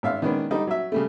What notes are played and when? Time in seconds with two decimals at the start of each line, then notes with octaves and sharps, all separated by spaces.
0.03 G#1 E5 F5
0.22 D#3 G#3 B3 C#4 D4
0.51 D3 G3 D#4
0.67 F#3 E5
0.92 C#3 G3 A3